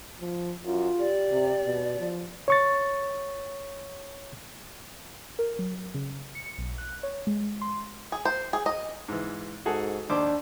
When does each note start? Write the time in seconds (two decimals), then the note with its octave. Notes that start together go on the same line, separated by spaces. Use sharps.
0.20 F3
0.65 F#2 F4
0.99 G4 D5
1.31 C3
1.66 B2
1.99 F3
2.48 C#5 C#6 A6
5.39 A#4
5.59 F#3
5.94 C#3
6.35 C#7
6.58 B1
6.78 F#6
7.03 C#5
7.27 G#3
7.61 C6
8.12 G#4
8.25 C5
8.53 G#4
8.66 D#5
9.08 G#2 E3
9.66 G#2 F#4 G#4 A4
10.10 D#2 D4 C5 D6